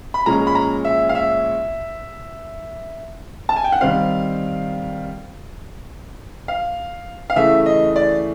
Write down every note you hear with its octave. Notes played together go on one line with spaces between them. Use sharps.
B5
A#2 F3 G#3 C#4 A#5
B5
A#5
E5
F5
E5
A5
G#5
G5
F#5
D#3 G3 C4 F5
F5
F5
C#3 E3 A3 E5
D#5
D5